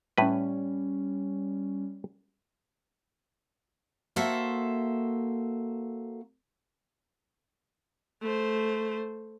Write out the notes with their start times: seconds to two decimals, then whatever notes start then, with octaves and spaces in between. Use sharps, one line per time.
0.18 A2 G3 C#4 B4
4.16 A#3 F#4 A4 C5 E5
8.22 A3 C5